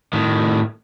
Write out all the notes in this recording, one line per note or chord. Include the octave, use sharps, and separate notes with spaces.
A2 D#3